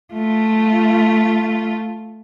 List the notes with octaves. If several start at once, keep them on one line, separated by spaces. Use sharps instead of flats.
A3 F4